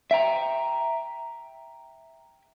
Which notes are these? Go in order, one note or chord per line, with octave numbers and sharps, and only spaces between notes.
E5 G5 A#5